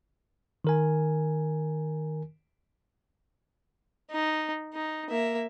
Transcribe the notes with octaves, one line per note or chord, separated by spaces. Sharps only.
D#3 A#4 G#5
D#4
D#4
A#3 E5